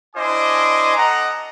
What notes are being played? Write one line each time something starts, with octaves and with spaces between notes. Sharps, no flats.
D4 E4 C5 D#5 G#5 D6
A4 D#5 F#5 A#5